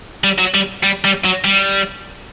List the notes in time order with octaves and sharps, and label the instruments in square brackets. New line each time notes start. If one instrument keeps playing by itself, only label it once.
[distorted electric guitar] G3
F#3
G3
G3
G3
F#3
G3